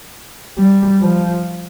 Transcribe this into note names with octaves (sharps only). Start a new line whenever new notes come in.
G3
F3